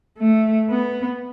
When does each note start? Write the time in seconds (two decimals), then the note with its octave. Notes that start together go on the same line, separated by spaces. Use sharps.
0.18 A3
0.69 B3